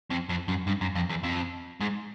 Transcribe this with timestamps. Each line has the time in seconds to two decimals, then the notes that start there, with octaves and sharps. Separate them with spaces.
0.10 F2
0.29 F2
0.48 F#2
0.67 G2
0.81 F#2
0.96 F2
1.10 E2
1.24 F2
1.81 G#2